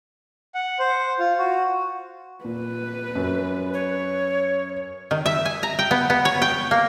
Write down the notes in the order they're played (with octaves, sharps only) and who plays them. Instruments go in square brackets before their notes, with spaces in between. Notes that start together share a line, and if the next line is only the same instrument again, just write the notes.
[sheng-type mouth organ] F#5
C5
F4
F#4
[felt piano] A#2 [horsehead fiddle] B4
[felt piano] F#2
[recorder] C#5
[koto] D#3
E5
G#5
A#5
G5
B3
B3
C#5
G5
A#3